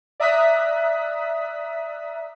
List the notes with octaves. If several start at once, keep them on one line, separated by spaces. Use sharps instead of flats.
D5 E5 A#5 D#6 F#6 B6